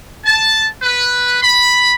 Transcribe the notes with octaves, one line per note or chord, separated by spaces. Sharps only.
A5
B4
B5